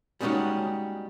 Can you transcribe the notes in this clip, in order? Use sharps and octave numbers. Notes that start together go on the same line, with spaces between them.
G3 G#3 A#3 C#4 D#4 F#4